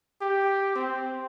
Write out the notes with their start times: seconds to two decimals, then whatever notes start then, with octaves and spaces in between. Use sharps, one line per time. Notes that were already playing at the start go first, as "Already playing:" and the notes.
0.21 G4
0.76 C4